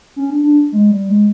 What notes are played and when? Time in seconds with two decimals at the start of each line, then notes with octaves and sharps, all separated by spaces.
0.16 C#4
0.30 D4
0.44 D4
0.72 G#3
0.91 G3
1.09 G#3